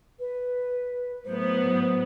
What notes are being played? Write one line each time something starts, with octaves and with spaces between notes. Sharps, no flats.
B4
A2 F#3 B3 C5